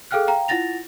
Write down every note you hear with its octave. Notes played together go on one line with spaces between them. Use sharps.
G#4 A4 F5 G5 F6 F#6
F5 G5 A#5
E4 F4 F#5 A6 A#6 F7